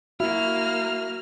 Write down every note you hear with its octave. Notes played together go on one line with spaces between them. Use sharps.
A#3 E4 F#4 F6